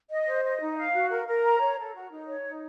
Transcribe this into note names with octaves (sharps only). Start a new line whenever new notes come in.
D#5
C5
D#5
D#4
F5
F#4
A#4
A#4
A#5
C#5
A4
F#4
D#4
C#5
D#4